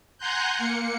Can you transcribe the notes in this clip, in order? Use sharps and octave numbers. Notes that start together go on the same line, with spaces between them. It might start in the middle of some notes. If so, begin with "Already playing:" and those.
F#5 G#5 A#5 C6 F#6 G6
A#3 C#7